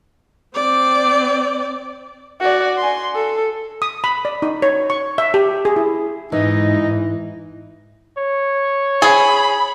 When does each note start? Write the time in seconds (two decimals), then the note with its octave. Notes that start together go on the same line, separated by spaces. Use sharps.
0.55 C4 D5
2.40 F#4 D5
2.78 G#5 C6
3.15 A4
3.82 D#6
4.04 B5
4.25 D5
4.42 D#4
4.62 C#5
4.90 C#6
5.18 E5
5.34 G4
5.65 G#4
5.76 E4
6.32 G#2 E3 D#4 D#5
8.18 C#5
9.02 G#4 B5